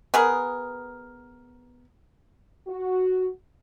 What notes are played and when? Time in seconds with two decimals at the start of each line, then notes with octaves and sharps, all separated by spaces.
0.14 B3 G#4 A#4
2.68 F#4